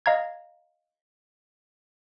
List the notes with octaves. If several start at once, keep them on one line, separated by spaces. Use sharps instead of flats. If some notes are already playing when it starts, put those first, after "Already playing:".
D#5 F5 A#5 G#6